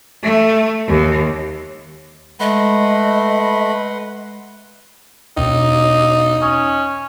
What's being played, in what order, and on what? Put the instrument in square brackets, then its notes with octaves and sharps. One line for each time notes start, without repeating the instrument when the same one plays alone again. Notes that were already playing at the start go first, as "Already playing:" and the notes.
[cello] A3
D#2
[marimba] G#3 [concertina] A3 B5 [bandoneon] B4 F#5 C6 [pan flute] D#5
[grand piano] E1 [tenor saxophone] D#4
[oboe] C#4 [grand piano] D#6